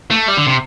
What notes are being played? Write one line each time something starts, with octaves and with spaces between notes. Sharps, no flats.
A3
G3
D3
C3